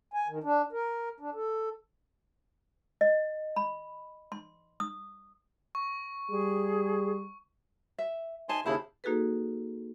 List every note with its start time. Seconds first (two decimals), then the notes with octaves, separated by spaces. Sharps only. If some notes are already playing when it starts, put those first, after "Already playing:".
0.14 G#5
0.28 D#3
0.44 D4
0.72 A#4
1.20 D4
1.35 A4
3.01 D#5
3.56 B5
4.32 C6
4.80 D#6
5.75 C#6
6.31 G3 G#4
7.98 E5
8.49 D#4 C5 G#5 A5 C6
8.66 D#2 C#3 E4 C5 A5 B5
9.04 A#3 D#4 F#4 G#4 A4 B4